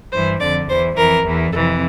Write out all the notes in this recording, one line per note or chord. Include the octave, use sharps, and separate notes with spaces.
G2 E3 C5
F2 D3 D5
E2 E3 C5
F2 E3 A#4
E2 E3
F2 C3 E3 A4